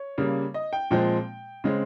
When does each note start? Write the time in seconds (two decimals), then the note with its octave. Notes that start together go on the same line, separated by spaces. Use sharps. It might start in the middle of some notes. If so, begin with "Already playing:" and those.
Already playing: C#5
0.18 C#3 G3 A#3
0.54 D#5
0.73 G5
0.91 A#2 F3 G#3 C4 G5
1.64 C#3 G#3 C4